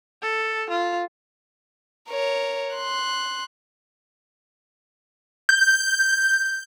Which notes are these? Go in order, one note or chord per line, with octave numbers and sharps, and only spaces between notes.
A4
F4
A#4 C#5
C6 F#6
G6